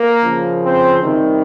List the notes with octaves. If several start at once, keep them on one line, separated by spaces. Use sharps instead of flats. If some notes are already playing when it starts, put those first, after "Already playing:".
Already playing: A#3 A#4
C#3 F3
C4 C5
C3 D#3 G3